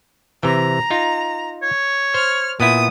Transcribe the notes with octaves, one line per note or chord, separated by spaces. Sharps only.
C3 E3 A#5
D#4 F4
C#5
C5 F6
A#2 B3 E4 D#6